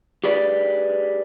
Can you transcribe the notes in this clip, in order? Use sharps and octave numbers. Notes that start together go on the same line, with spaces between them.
G4 G#4 B4 D5